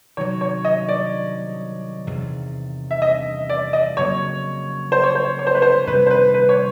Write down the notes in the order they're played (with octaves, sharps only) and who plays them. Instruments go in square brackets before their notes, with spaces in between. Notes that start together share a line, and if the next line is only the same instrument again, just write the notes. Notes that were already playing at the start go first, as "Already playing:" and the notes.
[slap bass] C3 D#3 F#3 [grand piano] C#5
[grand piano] C#5
D#5
D5
[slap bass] E2 C3 D#3
[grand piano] E5
D#5
D5
D#5
[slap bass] F2 C#3 F#3 A#3 [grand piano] C#5
[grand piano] C5
C#5
C5
C#5
C5
B4
C5
[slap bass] F2 C3 D#3 G3 [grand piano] B4
[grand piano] C5
B4
B4
C#5